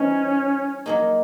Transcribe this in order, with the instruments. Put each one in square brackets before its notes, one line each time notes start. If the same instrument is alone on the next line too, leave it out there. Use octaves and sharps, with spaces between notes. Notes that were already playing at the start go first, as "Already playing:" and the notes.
Already playing: [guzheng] E3 G3 C4 D#4 [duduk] C#4
[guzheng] F#3 A#3 D#4 G#4